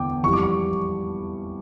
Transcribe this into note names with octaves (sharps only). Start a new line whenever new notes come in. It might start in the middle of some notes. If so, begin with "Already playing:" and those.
Already playing: E2 D3 G5 D6
F2 E3 G3 C#6
D6
C#6